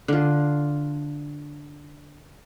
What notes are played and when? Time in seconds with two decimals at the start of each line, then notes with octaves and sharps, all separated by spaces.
0.08 D3 F4